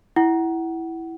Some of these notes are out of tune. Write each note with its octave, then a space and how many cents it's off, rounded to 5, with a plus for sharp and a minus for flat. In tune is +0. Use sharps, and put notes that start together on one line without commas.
E4 +0 F#5 +25